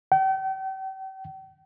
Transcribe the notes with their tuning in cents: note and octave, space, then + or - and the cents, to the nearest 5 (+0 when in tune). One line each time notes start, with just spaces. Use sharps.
G5 -40